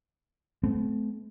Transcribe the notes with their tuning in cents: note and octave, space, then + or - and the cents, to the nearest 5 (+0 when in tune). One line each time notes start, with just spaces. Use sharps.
A3 -35 C4 -45